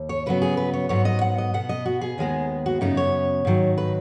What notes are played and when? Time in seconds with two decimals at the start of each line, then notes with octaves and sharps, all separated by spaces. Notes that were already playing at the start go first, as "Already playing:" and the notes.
Already playing: D#2
0.09 C#5
0.26 C#3 F#3 B3 B4
0.42 G#4
0.57 B4
0.74 C#5
0.89 G#2 F#3 B3 C#5
1.05 D#5
1.21 F#5
1.38 D#5
1.54 B2 B3 F#5
1.69 D#5
1.85 F#4
2.01 G#4
2.18 D#2 D#3 G#3 B3
2.66 F#4
2.81 F#2 C#3 B3 D#4
2.97 C#5
3.45 G#2 D#3 F#3
3.78 B4